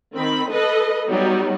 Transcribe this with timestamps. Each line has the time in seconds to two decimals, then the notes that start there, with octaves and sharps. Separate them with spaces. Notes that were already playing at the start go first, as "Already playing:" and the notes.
0.15 D#3 C4 B5
0.51 A4 B4 D#5
1.07 F#3 G3 B3 D#4 F#4